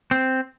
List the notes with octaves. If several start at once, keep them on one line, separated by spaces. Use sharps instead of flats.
C4